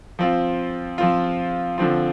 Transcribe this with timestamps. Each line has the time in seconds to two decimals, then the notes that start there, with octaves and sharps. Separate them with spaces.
0.19 F3 C4 F4
0.98 F3 C4 F4
1.78 D3 F3 C4 F4